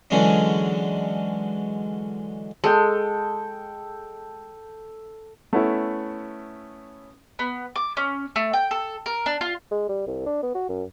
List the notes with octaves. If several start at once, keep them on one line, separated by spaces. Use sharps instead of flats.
D3 E3 F#3 G#3 C#4 D4
G#3 A4 G5
A3 B3 C#4 E4
B3
D6
C#4
A3
G5
A4
A#4
D4
F4
G#3
G3
C2
D4
B3
F#4
F#2